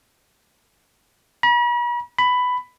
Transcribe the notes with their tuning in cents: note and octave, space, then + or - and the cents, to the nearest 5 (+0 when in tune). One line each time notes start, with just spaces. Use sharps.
B5 -45
B5 +10